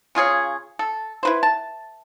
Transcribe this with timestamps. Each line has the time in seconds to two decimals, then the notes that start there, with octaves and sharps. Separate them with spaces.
0.15 C#3 F4 G#4 C#5
0.79 A4
1.23 E4 B4 C5
1.43 A5